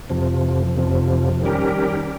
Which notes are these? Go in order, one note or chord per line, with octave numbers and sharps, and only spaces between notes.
F2 C3 F3
F2 C3 F3
D#3 G3 C#4 G4 A#4